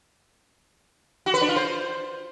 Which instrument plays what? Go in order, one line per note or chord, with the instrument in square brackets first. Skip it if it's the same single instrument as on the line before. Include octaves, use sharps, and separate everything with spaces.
[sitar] F#4
B4
D4
F4
C5